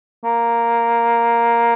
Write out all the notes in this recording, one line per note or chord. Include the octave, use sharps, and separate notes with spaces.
A#3